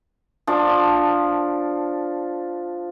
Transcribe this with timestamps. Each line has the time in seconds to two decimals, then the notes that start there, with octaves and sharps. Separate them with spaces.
0.47 F3 D4